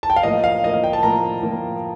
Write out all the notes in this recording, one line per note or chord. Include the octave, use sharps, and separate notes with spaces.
A5
G5
F5
A2 F3 A#3 D#5
F5
A2 F3 A#3 D#5
F5
G5
A5
A2 F3 A#3 A#5
A2 F3 A#3